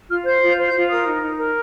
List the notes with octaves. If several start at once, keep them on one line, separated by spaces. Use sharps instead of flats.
F4 F6
C5 G6
F4
G6
C5
G6
F4
A#4 D#6
D#4
D#4
A#4